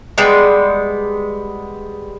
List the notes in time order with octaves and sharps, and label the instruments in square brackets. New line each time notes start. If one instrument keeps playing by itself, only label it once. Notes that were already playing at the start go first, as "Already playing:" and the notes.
[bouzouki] G3 G#3 B3